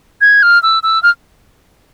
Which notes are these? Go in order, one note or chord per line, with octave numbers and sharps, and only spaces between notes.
G#6
F6
E6
E6
F6